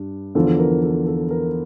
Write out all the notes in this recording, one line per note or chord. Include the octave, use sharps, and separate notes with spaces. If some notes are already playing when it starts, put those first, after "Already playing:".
Already playing: G2
E2 D3 F3 A4
A#4
A4
A4
A#4